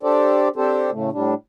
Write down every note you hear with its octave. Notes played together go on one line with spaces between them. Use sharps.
D4 G4 A4 C5 D5
C4 D4 G4 A4 C5
A2 C#3 A3
A2 G3 D4